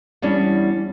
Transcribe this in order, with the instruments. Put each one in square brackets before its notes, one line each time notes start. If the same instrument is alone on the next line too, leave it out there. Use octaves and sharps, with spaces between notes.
[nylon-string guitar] E2 G3 C#4 D4